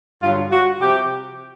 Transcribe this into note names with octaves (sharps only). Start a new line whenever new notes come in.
G2 D3 F#3 F4
F#4
C3 F3 G4